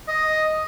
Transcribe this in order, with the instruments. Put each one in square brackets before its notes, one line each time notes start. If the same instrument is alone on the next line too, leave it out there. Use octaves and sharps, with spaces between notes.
[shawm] D#5